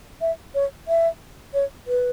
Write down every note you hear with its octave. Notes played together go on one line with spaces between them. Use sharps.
E5
C#5
E5
C#5
B4